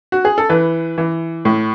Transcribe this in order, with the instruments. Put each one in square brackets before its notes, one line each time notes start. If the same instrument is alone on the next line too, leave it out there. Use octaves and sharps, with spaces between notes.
[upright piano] F#4
G#4
A4
E3 B4
E3
A2